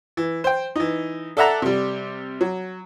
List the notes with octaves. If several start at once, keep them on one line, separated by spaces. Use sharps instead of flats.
E3
C5 G5
E3 D#4
A4 D5 E5 F#5 A5 A#5
C3 G3
F#3